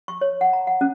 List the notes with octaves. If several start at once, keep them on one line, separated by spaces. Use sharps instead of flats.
C#6
C#5
F#5
A#5
F#5
C#4